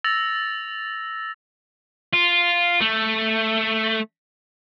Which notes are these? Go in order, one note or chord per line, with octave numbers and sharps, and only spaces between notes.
E6 A6 A#6 F7
F4
A3